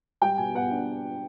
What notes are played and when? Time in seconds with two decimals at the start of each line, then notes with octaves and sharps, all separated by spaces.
0.21 G3 G5
0.38 B2 G#5
0.55 B3 F#5
0.71 D4